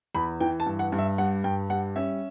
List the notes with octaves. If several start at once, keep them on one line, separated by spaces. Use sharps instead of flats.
E2 B5
E3 G5
A5
G2
F#5
G2
E5
G3 F#5
G2 G5
G3 F#5
C#4 E5